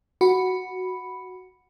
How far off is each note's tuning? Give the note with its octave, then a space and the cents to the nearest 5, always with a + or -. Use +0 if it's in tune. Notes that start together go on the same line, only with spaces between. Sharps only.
F#4 +0 B5 +0